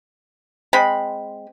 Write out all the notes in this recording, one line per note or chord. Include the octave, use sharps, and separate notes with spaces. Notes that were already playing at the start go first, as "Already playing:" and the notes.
G#3 C4 B5